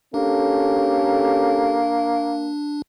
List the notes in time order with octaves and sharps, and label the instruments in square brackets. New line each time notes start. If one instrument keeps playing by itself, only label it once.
[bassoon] A#3 [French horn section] C#4 G4 A4 [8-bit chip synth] D4